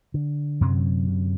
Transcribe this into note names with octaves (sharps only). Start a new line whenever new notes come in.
D3
F#2 C3 F#3
C3